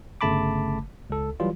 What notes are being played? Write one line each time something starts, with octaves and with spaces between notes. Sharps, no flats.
G1 C#3 A3 A5 B5 D6
C#2 A4
E3 F#3 G3 F4